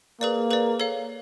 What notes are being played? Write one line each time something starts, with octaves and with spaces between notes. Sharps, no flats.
A#3 G#4 B4 D5
G#4 B4 D5
A4 C#5 F5